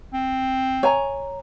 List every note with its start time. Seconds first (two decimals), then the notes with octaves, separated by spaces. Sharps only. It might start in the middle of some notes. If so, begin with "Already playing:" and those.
0.14 C4
0.83 C#5 G#5 A#5